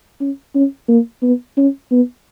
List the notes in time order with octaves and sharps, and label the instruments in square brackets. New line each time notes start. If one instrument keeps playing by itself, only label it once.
[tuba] C#4
C#4
A#3
B3
C#4
B3